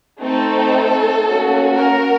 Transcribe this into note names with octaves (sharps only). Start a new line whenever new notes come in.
A3 C4 D#4 A4
A#3 C#4 F#4
A#4